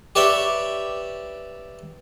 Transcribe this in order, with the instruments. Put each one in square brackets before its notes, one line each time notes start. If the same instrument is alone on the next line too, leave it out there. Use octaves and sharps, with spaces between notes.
[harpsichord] G4 B4 C#5 D5 E5 G5